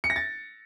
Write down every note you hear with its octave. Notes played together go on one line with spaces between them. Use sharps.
C#7
A#6
A6